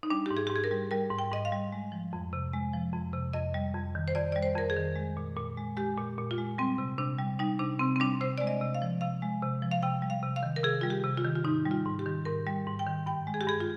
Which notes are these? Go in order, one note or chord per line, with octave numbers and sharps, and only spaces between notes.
D#4
G3 D4
G#2 G4
G#4
G#2 G4
G#4
A#4
G3
G3 A#4
G#2
G5
G#2 D#5
F5
G3
G#3
F3
F2
C3
G#3
F3
F2
C3
F2 D#5
G3
F2
D#3
C5
F2 D5
G3 D5
C5
F2 A#4
G#4
D#3
G#3
A#2
A#2
G#3
G#3 G4
A#2
A#2
F4
G#3
G3 C4
C3
C3 D4
G3
G3 D#4
C3 D4
C3 C4
C4
G3 D4
C3 C5
G#3 D5
D#5
C3
F5
F3
C3 F5
G#3
C3
F3
F5
C3 G5
G3
F5
C3
F5
D#3
A#4
C3 G#4
G3 F4
G4
C3
F4
D#3
F4
G#2 D#4
G3
F4
G#2
G4
D#3
G#2 A#4
G3
G#2
G5
D#3
G2 G5
G#3
G#4
G4
G2 G#4
F4